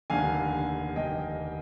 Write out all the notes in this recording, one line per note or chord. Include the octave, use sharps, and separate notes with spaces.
F1 D#2 D3 F5 G#5
F1 D#2 D3 D#5 G5